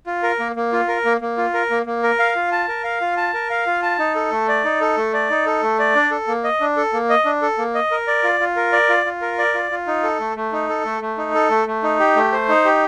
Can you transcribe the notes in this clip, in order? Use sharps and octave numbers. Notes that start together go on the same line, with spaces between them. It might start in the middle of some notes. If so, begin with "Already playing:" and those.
F4
A#4
A#3
A#3
F4
A#4
A#3
A#3
F4
A#4
A#3
A#3
A#4
F5
F4
A5
A#4
F5
F4
A5
A#4
F5
F4
A5
D#4
A4
A3
D5
D#4
A4
A3
D5
D#4
A4
A3
D5
D4
A4
A#3
D#5
D4
A4
A#3
D#5
D4
A4
A#3
D#5
A#4
D5
F4
F4
A#4
D5
F4
F4
A#4
D5
F4
F4
D#4
A4
A3
A3
D#4
A4
A3
A3
D#4
A4
A3
A3
D#4
G4
A3
C5
D#4
G4